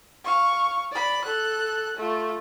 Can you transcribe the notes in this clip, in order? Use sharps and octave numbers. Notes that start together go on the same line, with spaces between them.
F5 C#6
D5 B5
A4 F#6
A3 F4